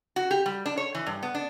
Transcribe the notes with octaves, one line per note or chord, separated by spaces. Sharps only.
F#4
G4
G3
D4
C#5
E3
G2
B3
D4